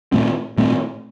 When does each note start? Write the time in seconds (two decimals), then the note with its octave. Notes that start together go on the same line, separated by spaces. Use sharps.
0.12 A#2 A3 C4
0.58 A#2 A3 C4